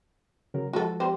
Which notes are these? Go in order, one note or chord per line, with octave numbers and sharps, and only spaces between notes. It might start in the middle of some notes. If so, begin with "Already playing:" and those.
C#3 F#3 A#4
F3 G#3 F#4 A4
G3 C4 C5